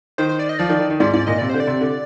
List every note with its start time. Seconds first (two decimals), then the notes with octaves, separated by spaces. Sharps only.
0.18 D#3 C5
0.29 C5
0.39 D5
0.49 D#5
0.59 F3 D5
0.69 D#3
0.79 D#3
0.90 D#3
1.00 G#2 D5
1.13 G#2 D5
1.27 A#2 D#5
1.38 C3 D5
1.49 D3 C5
1.60 D5
1.67 C3
1.81 D3